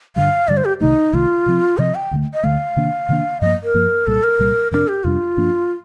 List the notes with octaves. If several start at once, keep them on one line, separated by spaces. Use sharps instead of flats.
G2 D3 G3 F5
G2 D3 G3 D5
C5
G4
C2 C3 D#3 A3 D#4
C2 C3 D#3 A3 F4
C3 F3 C4
C3 F3 C4 D#5
G5
D2 D3 A3
D#5
D2 D3 A3 F5
C3 D#3 A#3 D4
C3 D#3 A#3 D4
G2 F3 A#3 D#5
A#4
G2 F3 A#3
C2 A#2 G3 A4
A#4
C2 A#2 G3
F2 C3 G3 D4 A#4
G4
F2 C3 G3 D4 F4
G2 F3 A#3 D4